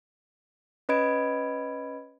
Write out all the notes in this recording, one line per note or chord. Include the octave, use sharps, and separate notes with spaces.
C#4 B4 D#5 B5 G#6 D7